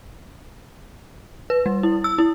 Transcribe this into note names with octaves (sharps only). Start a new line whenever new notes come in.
B4
G3
E4
E6
E4